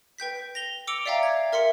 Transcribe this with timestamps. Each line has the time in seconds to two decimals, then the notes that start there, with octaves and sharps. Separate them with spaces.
0.18 B4 G5 G6 B6
0.55 A#6 F7 G7
0.87 D6 E6 C#7 D7 F7 G7
1.06 D5 E5 F5 G5 A#5
1.23 G#6
1.53 A#4 E5 C6 C#7